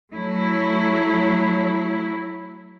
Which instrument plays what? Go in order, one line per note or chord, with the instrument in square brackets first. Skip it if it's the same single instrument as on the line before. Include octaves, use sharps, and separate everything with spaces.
[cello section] F#3 A3 E4